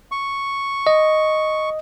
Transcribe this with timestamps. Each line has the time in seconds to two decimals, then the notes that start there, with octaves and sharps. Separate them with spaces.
0.12 C#6
0.87 D#5